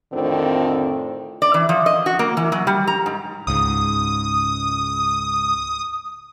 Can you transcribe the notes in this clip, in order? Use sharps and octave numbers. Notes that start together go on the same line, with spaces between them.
F2 A2 D3 D#3 C4 F4
D5
E3
F3
D#5
F#4
A#3
E3
F#3
G3
A#5
G#2
C#2 G#2 D#6